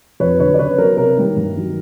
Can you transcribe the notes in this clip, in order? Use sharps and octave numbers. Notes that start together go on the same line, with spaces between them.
F2 B4 C#5
D3 F#3 B4 C#5
D5
C#3 B4 C#5
F#3 B3 A#4
C3 A#4
D#3 G3
G2
D#3 F#3